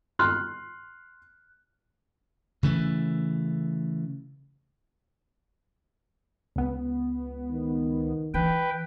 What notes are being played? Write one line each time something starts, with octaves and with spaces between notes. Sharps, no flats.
C6 F6 F#6
C#3 E3 A3
C#2 B3
D#3
E3 B4 G5